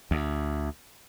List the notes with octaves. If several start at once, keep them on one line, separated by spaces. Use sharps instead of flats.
D2